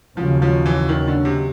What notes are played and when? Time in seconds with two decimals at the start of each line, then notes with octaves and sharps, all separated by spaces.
0.17 D#2 C#3 F3 F#3
0.42 F3
0.66 E3
0.89 D#3
1.08 D3
1.25 C3